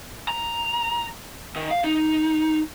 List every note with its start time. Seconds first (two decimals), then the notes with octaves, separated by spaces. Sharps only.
0.28 A#5
1.56 D#3
1.71 F5
1.84 D#4